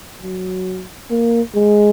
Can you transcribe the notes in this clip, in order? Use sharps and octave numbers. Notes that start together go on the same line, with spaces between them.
F#3
A#3
G#3